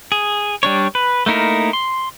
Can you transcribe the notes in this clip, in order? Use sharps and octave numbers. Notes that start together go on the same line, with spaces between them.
G#4
G3 D4 C#5
B4
A3 A#3 D#4 E4 A#4
C6